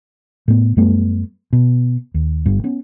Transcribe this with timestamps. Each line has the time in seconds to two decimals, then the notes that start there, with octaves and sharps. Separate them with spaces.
0.48 A2 B3
0.77 F#2 G3 A3 B3
1.53 B2
2.14 D#2
2.46 G1 G2
2.64 B3 C#4